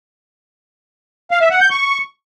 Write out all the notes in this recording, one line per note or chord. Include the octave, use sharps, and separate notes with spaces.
F5
E5
F#5
G6
C#6